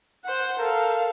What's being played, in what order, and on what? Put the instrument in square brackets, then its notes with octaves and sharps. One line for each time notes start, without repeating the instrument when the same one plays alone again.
[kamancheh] C5 F#5
[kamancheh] A4 F5 [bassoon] A#4